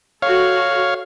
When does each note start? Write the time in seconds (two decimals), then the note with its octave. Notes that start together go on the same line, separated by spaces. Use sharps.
0.22 F#4 A4 C#5 F5